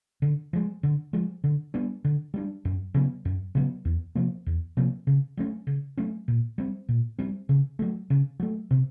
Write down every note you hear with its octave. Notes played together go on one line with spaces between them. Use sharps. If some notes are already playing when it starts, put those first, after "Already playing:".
D3
F3 G#3
D3
F3 G#3
D3
G3 B3 D4
D3
G3 B3 D4
F#2
C#3 F#3 B3
F#2
C#3 F#3 B3
E2
C3 F3 A#3
E2
C3 F3 A#3
C#3
F#3 A3 C#4
C#3
F#3 A3 C#4
A#2
G3 C4
A#2
G3 C4
C#3
F#3 A3
C#3
F#3 A3
C3